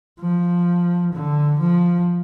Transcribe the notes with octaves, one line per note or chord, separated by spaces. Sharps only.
F3
D3
F3